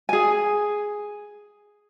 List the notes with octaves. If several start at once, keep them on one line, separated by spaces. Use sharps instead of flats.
G#4 G#5